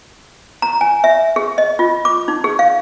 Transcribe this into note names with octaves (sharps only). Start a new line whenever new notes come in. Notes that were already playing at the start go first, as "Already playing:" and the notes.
A#5
G#5
E5
G#4
D#5
F4
D6
D#4
G#4
F5